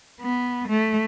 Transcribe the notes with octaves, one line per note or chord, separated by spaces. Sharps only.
B3
A3